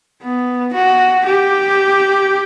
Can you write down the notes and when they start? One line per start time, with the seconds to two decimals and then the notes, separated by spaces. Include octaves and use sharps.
0.21 B3
0.73 F#4
1.25 G4